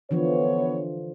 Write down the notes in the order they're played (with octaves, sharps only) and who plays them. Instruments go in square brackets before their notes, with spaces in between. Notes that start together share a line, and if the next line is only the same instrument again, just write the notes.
[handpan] D3 E3 F3 [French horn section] B3 C#5